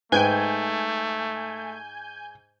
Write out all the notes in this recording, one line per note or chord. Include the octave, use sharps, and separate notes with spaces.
G#2 A3 B4 G5 G#5 G6